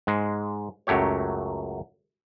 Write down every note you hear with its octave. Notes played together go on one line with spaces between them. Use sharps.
G#2 G#3
C#2 F#2 F#3 A3 G4 C#5